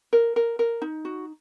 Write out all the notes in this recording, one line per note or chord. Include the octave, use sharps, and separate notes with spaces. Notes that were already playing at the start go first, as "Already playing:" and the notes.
A#4
A#4
A#4
D#4
F#4